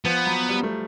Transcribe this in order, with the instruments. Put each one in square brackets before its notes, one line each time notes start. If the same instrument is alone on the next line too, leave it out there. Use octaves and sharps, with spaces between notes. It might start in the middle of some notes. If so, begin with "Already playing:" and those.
[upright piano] F3 [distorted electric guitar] B3
[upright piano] F#3
G3
A3